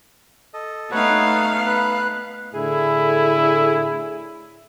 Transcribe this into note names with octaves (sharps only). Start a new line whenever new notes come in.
A4 D#5
A3 B3 D#4 B4 C#5 F5 F#5
B4 F#6
A2 D3 E4 G#4